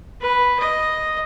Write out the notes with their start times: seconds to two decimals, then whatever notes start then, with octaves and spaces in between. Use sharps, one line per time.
0.21 B4
0.59 D#5